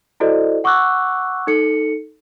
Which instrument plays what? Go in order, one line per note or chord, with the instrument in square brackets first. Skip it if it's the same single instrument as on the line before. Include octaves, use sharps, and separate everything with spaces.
[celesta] E4 F#4 A4 C5 D5 D#5
F#5 C#6 D6 E6 F#6
D#4 A4 C#7